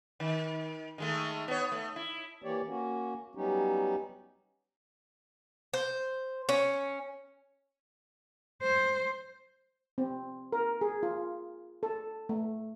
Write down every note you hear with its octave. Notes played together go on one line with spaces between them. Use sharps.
D#3
D#3 G#3 A3
B3 C#5
A3
E4
E3 A#3 G4 C#5 D5
A#3 C#4 F#4
F#3 G3 B3 C#4 D#4 G4
C5
C#4
C5
C4
A#4
G#4
F4
A4
A3